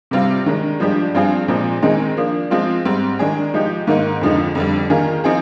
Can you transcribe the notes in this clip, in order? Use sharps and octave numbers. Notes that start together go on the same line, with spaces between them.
C3 G3 C4 F4
D#3 G#3 D4
G2 F3 G#3 D4 G4
G2 F3 C4 F4 G#4
A#2 F3 G#3 C4
D#3 G#3 C4 D#4 G#4
F3 A#3 D4
F3 G#3 C4 F4
G#2 G3 C4
D#3 G#3 D4 G#4
F3 G#3 D#4 G4
G#2 D#3 A#3 D#4
F2 D3 F3 G#3 D#4
F2 D3 G3
D#3 A#3 F4 G#4
F3 C4 D#4 G#4